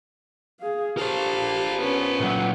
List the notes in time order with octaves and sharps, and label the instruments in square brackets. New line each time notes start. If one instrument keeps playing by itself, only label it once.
[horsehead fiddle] G#4 F5
[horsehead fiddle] D4 G4 [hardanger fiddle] A4 F5 [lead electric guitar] A#4 C5
[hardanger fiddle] B3 C#4
[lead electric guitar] A#2 F#3